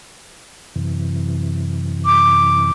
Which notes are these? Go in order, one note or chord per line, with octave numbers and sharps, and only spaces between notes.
F#2 C3 E3
D6